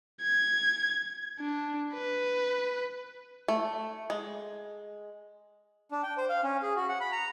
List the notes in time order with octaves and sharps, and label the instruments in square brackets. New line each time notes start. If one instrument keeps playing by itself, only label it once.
[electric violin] G#6
D4
B4
[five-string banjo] A3
G#3
[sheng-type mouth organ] D4
G5
C5
F5
C#4
G#4
F#4
F#5
B5
A#5